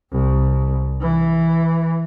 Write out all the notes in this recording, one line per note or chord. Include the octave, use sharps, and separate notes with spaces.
C2
E3